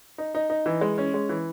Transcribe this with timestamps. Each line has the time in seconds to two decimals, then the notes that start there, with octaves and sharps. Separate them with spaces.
0.18 D#4
0.35 D#4
0.50 D#4
0.66 E3
0.81 G#3
0.98 C#4
1.14 G#3
1.29 E3